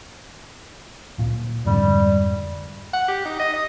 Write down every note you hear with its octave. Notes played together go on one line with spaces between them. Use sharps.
D1 A#2
F2 G#2 D3 G3
F#5
G4
D#4
D#5
D#5